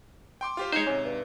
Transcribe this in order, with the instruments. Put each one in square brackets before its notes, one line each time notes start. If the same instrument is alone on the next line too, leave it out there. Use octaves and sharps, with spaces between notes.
[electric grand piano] G5 C6 D6
F4 G4 C5
[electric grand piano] G#3 D#4 [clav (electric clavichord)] C5 C#5
[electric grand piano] G#2 C3 [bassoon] C#4
[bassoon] G2